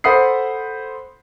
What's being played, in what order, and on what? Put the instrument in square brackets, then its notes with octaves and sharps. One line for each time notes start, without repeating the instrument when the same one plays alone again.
[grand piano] A4 C5 F#5 B5 D#6 C7